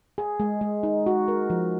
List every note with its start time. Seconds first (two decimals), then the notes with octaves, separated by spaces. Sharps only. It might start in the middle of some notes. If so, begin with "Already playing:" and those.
0.18 G#4
0.40 G#3
0.61 G#3
0.83 D#4
1.06 F#4
1.28 A#4
1.50 F3